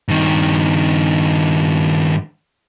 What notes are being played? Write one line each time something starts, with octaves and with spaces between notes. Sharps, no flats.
G2 D#3